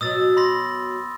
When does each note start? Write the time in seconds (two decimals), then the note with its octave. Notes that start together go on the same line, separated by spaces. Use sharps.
0.01 B2 F#3 D#6 E6 A6
0.37 B5 C6 A#6